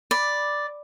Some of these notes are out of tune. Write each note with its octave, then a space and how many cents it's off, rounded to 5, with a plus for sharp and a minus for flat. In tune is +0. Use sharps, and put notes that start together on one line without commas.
D5 +0 B5 -5